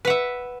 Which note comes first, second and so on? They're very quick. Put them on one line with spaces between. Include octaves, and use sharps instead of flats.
B4 F#5 E5